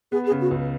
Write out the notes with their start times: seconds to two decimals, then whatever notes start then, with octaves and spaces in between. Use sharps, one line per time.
0.12 B3 G#4
0.27 G#4
0.31 C#3
0.41 F#4
0.51 C#2